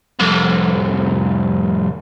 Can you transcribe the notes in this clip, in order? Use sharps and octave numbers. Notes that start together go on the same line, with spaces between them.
C2 F2